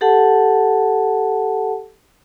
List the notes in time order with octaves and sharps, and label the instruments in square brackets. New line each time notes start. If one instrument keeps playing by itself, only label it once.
[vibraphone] G4 A4 F#5 A5